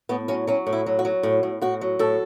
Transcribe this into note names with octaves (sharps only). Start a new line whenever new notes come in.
A2 B3
F#3 C#4
F#3 C#4
A2
E4
F#3
F#4
F#3
A2
A2
A2 F#4
F#3
A2 A4